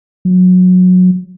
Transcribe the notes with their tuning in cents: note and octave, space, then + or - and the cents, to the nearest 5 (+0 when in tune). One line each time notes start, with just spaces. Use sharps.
F#3 -20